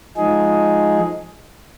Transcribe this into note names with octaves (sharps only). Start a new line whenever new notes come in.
F3 G#3 D#4 G#4